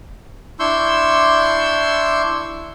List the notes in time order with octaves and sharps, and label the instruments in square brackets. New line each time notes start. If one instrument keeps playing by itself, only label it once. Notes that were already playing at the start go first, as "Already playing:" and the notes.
[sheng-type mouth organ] D4 E4 C6 C#6 E6 G6